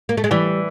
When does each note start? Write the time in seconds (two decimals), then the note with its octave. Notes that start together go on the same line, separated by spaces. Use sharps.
0.09 A#3
0.17 A3
0.24 G#3
0.31 E3 G3